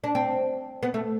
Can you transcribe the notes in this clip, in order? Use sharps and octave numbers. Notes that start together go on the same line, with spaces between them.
D4
C4
B3
A3